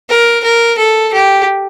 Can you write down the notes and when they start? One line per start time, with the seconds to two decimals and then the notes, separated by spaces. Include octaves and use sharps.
0.09 A#4
0.43 A#4
0.78 A4
1.12 G4